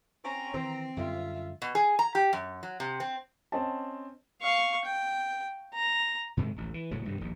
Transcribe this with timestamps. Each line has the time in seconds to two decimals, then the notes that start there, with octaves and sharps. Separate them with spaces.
0.25 C4 C#4 A#5
0.54 D#3 E3 C4
0.97 F#2 D3 G3 F4 E5
1.62 B2
1.75 G#4
1.99 A#5
2.15 G4
2.33 F#2
2.63 F#3
2.80 C3
3.00 C4
3.52 C4 C#4 D#5 A5
4.42 F5 C#6
4.85 G5
5.74 A#5
6.37 G#2 C3 D#3 G#3
6.56 D1 A1
6.74 E3
6.91 D#1 A2 C#3 F#3
7.05 G2 C3 D#3
7.21 D#1 A#1 D#2